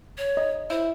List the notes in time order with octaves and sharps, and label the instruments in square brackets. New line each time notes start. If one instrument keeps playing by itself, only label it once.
[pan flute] C#5
[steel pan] D#5
[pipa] E4 [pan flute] C5